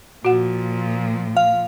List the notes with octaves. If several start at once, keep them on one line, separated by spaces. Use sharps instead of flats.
A#2 F3 F#4 F#5
F5